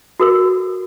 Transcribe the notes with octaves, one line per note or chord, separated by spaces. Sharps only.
F#4 A4 A#4